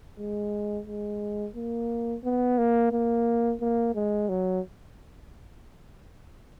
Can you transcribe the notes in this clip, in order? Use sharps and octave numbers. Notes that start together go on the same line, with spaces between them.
G#3
G#3
A#3
B3
A#3
A#3
A#3
G#3
F#3